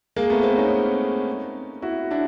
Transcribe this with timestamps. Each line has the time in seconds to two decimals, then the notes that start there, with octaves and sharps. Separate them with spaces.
0.16 G#3 A#3
0.30 A3 B3
0.43 A#3 C4
0.58 C#4 D#4
1.82 E4 F#4
2.11 D4 E4